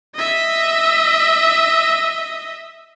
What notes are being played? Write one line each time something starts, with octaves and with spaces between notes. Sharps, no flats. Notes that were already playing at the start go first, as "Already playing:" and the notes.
D#5 E5